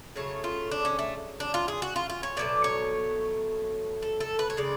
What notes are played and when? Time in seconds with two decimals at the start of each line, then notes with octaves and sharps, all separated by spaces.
0.16 C#3 F#3 A3 C#5
0.44 F4
0.71 D4
0.85 C#4
0.99 A3
1.40 D4
1.54 F4
1.68 G#4
1.82 F#4
1.96 F4
2.10 F4
2.23 C#5
2.37 B2 F#3 A3 D5
2.64 C#5
4.02 A4
4.20 A4
4.39 B4
4.50 C#5
4.57 C#3 G#3 D5